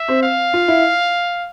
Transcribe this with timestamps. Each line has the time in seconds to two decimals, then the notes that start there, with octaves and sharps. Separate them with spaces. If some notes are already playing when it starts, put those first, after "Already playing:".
Already playing: E5
0.08 C4
0.23 F5
0.53 F4
0.68 E4